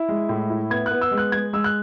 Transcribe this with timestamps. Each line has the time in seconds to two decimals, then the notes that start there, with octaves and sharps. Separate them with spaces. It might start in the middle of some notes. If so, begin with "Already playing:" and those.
Already playing: E4
0.09 G#3
0.29 A2
0.50 E4
0.70 B3 G#6
0.86 B3 F#6
1.01 E6
1.11 G#3
1.18 F#6
1.32 G#3 G#6
1.53 G#3 E6
1.64 F#6